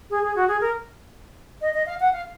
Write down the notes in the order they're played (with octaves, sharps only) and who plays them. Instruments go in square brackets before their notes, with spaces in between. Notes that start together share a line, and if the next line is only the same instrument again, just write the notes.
[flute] G#4
G#4
F#4
G#4
A#4
D#5
D#5
F5
F#5
F5